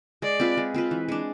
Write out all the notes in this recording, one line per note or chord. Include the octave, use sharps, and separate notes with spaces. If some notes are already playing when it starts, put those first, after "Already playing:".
G#3 D5
C4 F4 B4
G#3
C4 F4 B4
E3
G#3 D4